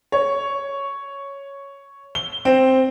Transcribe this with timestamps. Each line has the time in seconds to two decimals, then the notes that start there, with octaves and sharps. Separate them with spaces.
0.12 C#5
2.15 G7
2.45 C4